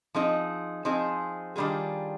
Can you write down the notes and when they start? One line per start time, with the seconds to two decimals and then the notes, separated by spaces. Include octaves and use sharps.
0.15 F3 C4 D#4 G#4
0.85 F3 C4 D#4 G#4
1.56 D#3 G3 D4 F4 G#4